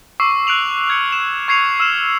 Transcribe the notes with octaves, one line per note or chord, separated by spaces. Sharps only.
C#6 D6 E6 C7
F#6 D7 F7 F#7
F6 G#6 C#7
E7
C#6 G#6 C7 C#7 F7
E6 F6 E7